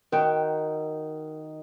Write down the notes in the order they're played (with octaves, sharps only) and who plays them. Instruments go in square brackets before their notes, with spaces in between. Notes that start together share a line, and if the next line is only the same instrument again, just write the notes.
[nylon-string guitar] D#3 F#4 G5 [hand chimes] A#4